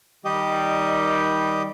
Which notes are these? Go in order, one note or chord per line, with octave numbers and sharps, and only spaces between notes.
D#3 G3 G4 D#5